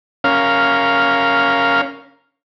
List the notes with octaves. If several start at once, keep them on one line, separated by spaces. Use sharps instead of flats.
C#4 A#4 F5